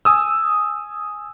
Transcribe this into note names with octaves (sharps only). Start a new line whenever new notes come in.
G#5 D#6 E6